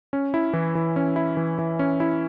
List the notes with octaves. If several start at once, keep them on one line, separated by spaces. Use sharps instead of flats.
C#4
E4
E3
E3
C#4
E4
E3
E3
C#4
E4